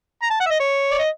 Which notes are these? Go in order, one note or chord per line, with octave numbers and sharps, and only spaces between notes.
A#5
A5
F#5
E5
D#5
C#5
D5
D#5